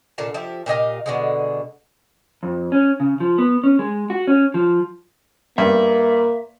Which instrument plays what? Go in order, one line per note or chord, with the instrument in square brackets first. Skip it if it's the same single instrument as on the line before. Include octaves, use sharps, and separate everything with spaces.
[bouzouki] A#2 D3 F5 A5
F3 G4 E5
A#2 G4 D#5 F5
B2 D3 G#3
[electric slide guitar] F2
C#4
C#3
F3
B3
C#4
G#3
F#4
C#4
F3
[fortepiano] G2 [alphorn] A#3 [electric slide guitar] E5